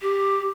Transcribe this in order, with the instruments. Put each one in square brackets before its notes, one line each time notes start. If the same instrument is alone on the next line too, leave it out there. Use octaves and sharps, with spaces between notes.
[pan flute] G4